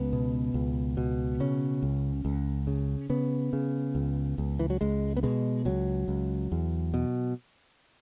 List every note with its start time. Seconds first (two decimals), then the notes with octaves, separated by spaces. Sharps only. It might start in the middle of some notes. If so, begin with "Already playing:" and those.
Already playing: C#2 B3
0.13 B2
0.54 C#2
0.97 B2
1.40 C#3 C#4
1.83 C#2
2.25 C#2
2.67 C#3
3.10 C#3 B3
3.53 C#3
3.95 C#2
4.38 C#2
4.59 E3
4.70 F#3
4.81 C#2 G#3
5.17 B3
5.23 B2 G#3
5.65 C#2 F#3
6.08 C#2
6.52 E2
6.94 B2